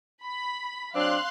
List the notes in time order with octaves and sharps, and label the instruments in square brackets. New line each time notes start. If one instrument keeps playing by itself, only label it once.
[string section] B5
[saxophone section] F#3 C4 D4 [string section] F5 C6 F#6